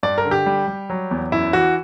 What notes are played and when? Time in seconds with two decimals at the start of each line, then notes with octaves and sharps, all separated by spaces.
0.03 G2 D5
0.18 A#4
0.25 D3
0.31 G4
0.46 G3
0.68 G3
0.90 F#3
1.11 E2
1.32 F#2 E4
1.53 E3 F#4